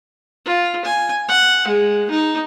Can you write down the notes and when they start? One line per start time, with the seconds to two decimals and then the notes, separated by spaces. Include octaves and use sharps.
0.46 F4
0.85 G#5
1.28 F#5
1.67 G#3
2.10 D#4